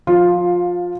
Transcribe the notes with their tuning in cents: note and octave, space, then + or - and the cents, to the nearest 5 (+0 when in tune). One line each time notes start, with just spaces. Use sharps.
F3 +20 F4 +5